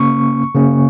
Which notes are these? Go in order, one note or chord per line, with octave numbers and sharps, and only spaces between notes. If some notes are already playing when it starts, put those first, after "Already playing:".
Already playing: C#3 A#3 C#4 C#6
C#3 A#3 C#4